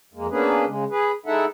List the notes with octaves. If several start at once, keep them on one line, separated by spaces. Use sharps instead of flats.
F2 G#3 A#3
A#3 B3 C#4 D4 G#4 B4
C#3 G#3
G#4 B4
G#3 D#4 E4 A4 E5 F#5